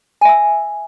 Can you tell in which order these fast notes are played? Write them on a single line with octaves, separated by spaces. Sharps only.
G#5 E5 E6